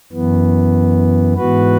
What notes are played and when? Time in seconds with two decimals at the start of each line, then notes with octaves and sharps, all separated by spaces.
0.12 F#2 E3 B3
1.36 G#2 E3 B3 F#4 B4